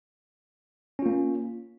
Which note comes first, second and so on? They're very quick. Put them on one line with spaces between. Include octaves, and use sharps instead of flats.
C#4 F4 A#3